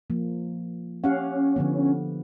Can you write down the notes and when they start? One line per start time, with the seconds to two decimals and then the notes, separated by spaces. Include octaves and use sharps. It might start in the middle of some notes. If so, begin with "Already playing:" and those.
0.10 F3 A#3
1.04 C#4 G4 F5 F#5
1.56 D3 F3 B3